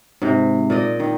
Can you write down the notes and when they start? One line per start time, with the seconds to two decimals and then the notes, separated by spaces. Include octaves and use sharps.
0.22 G#2 C3
0.70 A#2 D5 D#5
1.00 D#3